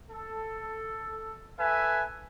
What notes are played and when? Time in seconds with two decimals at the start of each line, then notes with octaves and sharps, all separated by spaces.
0.11 A4
1.58 A4 B4 E5 G#5